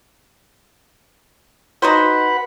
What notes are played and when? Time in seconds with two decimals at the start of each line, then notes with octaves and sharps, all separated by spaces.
1.82 D#4 F#4 B4 C5 F#5 B5